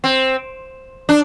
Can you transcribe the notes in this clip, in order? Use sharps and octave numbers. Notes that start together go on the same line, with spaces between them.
C4
D4